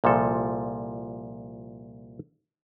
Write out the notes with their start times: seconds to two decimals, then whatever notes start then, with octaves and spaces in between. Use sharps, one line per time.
0.04 C2 A#2 F3 A4